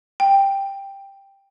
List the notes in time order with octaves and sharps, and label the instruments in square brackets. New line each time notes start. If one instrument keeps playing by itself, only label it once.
[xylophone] G5